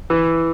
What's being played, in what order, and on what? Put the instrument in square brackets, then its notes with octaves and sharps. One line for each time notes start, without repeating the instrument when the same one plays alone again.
[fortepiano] E3